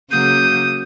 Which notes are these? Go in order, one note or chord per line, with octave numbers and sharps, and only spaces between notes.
C#3 F#3 A#3 D#6 G6